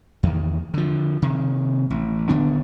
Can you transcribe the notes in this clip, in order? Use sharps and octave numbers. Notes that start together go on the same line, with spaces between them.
E2 D#3
D3 F3
C3 D#3
A1
D#1 D3 B3 D4